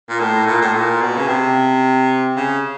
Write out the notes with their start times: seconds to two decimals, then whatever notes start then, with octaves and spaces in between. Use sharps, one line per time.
0.09 A#2
0.20 A2
0.47 A#2
0.62 A2
0.74 A#2
1.01 B2
1.16 C#3
1.28 C3
2.36 C#3